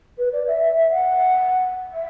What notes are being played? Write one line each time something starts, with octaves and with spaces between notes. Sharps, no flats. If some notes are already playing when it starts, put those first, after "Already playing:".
B4
D5
E5
E5
E5
F#5
E5